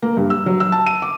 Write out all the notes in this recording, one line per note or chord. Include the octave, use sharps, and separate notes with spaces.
A#3
G2
E6
F#3
E6
A5
D#7
D6